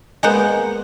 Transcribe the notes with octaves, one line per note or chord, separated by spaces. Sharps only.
G#3 A#3 B3 C5 F#5